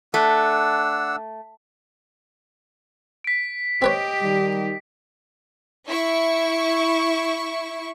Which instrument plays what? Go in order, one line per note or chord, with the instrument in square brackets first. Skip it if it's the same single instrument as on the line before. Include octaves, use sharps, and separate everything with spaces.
[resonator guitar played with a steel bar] A3 [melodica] D4 F#5 E6
[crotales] B6 D7
[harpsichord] C4 B4 C#5 [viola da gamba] G4 D#5
[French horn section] D#3 G3
[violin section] E4 C#6